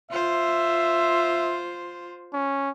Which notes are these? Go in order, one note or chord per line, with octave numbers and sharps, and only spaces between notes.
F4 C5 E5
C#4